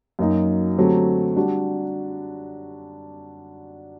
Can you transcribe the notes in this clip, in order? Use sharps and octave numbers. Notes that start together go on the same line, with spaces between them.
F#2 F#3 A#3 D#4
D3 F#3 A3 C4 G4
G3 D4 F#4